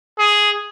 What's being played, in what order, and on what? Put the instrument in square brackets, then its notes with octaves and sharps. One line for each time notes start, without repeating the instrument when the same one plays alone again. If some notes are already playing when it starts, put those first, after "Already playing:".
[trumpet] G#4